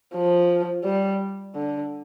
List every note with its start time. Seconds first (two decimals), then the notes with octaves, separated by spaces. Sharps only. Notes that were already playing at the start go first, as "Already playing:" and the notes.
0.15 F3
0.84 G3
1.55 D3